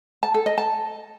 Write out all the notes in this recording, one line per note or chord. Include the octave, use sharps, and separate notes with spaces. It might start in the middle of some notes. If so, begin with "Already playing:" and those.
A5
A4
D#5
A5